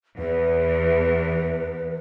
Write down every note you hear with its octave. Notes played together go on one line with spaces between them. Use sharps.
E2 B4